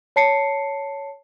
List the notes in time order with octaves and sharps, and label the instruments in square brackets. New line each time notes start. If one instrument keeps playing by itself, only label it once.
[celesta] C#5 A5 C7 C#7